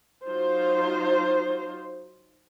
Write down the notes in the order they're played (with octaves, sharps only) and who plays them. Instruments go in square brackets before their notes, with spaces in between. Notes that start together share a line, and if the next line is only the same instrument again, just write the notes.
[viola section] F#3 D#4 F4 C5